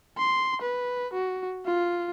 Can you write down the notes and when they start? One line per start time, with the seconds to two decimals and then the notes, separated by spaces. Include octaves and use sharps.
0.18 C6
0.62 B4
1.14 F#4
1.66 F4